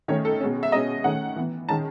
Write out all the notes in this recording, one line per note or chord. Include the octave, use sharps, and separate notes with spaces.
D#3 A3 C#4 C#5
A4
B2 G#3 C#4
E5
B2 G#3 C#4 D#5
D#3 A3 C#4 F#5
E3 B3
D#3 G#3 C#4 A5